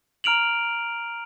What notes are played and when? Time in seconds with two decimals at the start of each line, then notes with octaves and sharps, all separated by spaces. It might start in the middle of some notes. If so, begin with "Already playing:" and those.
0.24 A#5 F6 D7 F7 F#7